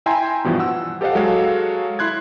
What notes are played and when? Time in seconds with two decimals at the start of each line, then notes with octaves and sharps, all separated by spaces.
0.06 E4 E5 G5 G#5 A#5 C6
0.44 G2 B2 E3 F3
0.59 F#5 E6
1.01 G4 A4 C5 D#5 F5 F#5
1.15 F#3 G#3 A4 C#5 F5
1.99 E4 C6 F#6 G#6